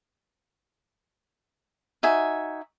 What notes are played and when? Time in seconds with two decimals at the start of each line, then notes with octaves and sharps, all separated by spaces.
2.03 D#4 F#4 E5 G#5